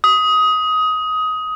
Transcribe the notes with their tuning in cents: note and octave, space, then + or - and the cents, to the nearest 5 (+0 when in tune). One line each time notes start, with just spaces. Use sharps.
D#6 +15